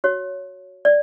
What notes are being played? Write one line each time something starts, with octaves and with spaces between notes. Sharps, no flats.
F#4 C#5
D5